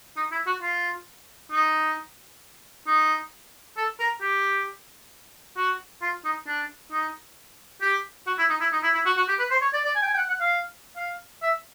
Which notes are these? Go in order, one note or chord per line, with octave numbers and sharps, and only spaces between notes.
D#4
E4
F#4
F4
D#4
D#4
A4
A#4
G4
F#4
F4
D#4
D4
D#4
G4
F#4
E4
D#4
E4
D#4
E4
E4
F#4
F#4
G4
B4
C5
C#5
D5
D5
G#5
G5
G#5
G5
F#5
F#5
F5
F5
E5